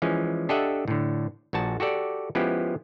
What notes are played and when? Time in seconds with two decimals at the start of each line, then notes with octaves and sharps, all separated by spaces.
0.02 E3 F3 G#3 C#4
0.49 D4 G4 A4 D#5 E5 F#5
0.88 A2 D3
1.53 A#1 A#2 F#4 A5
1.80 F#4 G4 A4 D5
2.35 F3 G#3 B3 C#4 E4 G4